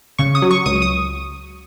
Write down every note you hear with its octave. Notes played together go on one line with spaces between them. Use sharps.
C#3 C#6
D#6
F#3
C#6
C#2 D#6
D#6